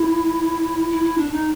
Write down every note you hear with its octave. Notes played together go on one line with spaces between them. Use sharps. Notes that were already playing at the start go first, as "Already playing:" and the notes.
Already playing: E4
E4
E4
D4
D#4